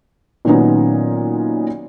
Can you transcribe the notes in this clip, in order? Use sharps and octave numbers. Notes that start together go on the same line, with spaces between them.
A#2 D#3 F#3 B3 C#4 D#4